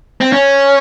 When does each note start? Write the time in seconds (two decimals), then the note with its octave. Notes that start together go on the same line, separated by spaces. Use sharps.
0.21 C4
0.32 C#4